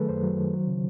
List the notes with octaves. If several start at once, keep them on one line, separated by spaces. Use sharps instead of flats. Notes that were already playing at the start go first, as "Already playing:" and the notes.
Already playing: D#3 F#3 A3 G#4 A4 B4
F#2 C5
F#3
D#3
F#3
C#3